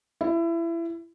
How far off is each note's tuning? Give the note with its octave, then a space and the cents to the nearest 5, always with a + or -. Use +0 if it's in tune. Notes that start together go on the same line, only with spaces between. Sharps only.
E4 +25